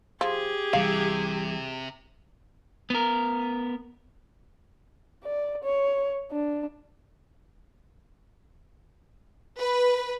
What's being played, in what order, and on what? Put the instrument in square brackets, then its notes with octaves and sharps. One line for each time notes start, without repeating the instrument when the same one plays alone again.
[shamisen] F3 [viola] G4 G#4
[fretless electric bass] C2 E3 G3 [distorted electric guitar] C3 [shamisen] F5
[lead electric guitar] B3 A#4
[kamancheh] D5
C#5
D4
[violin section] B4